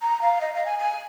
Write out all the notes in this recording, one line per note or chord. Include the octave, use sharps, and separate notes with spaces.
A#5
F5
D#5
F5
G#5
G#5